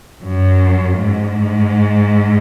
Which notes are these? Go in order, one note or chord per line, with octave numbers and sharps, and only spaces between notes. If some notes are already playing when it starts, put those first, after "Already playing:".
F#2
G#2